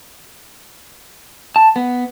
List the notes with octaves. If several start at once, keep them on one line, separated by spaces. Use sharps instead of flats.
A5
B3